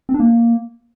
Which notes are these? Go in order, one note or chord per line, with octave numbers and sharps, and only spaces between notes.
C4
D4
A#3